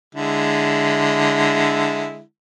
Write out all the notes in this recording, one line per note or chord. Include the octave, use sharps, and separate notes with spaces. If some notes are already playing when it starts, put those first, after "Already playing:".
D3 G#3 E4